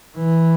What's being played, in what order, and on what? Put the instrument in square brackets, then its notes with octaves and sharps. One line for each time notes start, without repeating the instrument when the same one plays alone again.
[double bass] E3